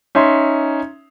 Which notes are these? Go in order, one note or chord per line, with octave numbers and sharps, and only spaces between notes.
C#4 D#4 E5 C6